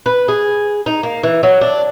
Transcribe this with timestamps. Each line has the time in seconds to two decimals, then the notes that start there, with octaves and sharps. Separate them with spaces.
0.06 B4
0.28 G#4
0.86 D#4
1.03 A#3
1.23 E3
1.43 F#3
1.61 D4